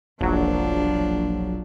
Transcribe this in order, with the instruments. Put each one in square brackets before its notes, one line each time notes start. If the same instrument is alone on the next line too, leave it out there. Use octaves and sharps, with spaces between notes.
[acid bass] E1 [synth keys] A#1 F#3 [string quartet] F3 D4